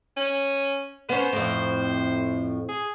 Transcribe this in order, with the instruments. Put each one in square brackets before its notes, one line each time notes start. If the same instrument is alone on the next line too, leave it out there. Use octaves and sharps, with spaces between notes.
[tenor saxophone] C#4
[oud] B3 C#4 [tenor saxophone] C5
[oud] F2 A2
[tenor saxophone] G#4